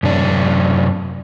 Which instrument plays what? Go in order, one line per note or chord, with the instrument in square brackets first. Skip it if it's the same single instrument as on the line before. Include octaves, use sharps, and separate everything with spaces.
[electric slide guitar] F#2 C3 D4